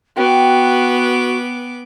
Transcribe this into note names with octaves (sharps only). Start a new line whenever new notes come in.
B3 F#4 G5 D6